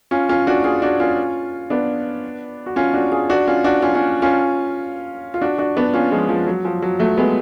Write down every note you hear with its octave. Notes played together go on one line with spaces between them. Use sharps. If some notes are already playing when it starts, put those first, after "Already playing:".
C#4 F4
C#4 F4
D4 F#4
F4 G#4
D4 F#4
C#4 F4
B3 D4
F#4
C#4 F4
D4 F#4
F4 G#4
D4 F#4
C#4 F4
D4 F#4
C#4 F4
C#4 F4
C#4 F4
F4
D4 F#4
D4 F#4
B3 D4
C#4 F4
F3 G#3
F3
F#3
F3
F#3
F#3 A3
G#3 B3